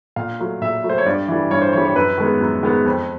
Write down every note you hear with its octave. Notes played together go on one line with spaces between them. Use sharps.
A#2 F5
F#3 A3
A#2 E5
F#3 A3
C5
C#5
G2 D5
E3 G3
G2 C#5
C5
E3 G3 C#5
C#5
F#2 B4
D#3 G#3 B3
F#2
D#3 G#3 B3
F2